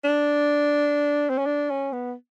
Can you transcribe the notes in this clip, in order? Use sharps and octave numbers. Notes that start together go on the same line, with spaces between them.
D4
C4
C#4
D4
C#4
B3